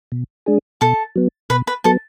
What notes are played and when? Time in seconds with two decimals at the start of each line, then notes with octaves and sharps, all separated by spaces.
0.12 B2
0.46 G#3 D4 G#4
0.81 B2 A4 A5
1.16 F#3 B3
1.50 B2 B4 B5
1.67 B4 B5
1.84 F#3 B3 A4 A5